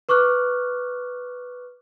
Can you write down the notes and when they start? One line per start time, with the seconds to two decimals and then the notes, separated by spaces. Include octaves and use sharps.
0.09 B4 C#6 D6 F6 F#6